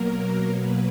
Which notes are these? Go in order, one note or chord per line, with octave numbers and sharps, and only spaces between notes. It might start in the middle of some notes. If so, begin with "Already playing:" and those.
Already playing: B2 F#3 A#3 A#4
B2 F#3 A#3 B4